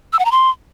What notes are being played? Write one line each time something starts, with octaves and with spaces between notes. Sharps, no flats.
E6
F#5
A#5
C6